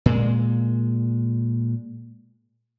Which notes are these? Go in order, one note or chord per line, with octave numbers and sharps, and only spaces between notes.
A#2 G#3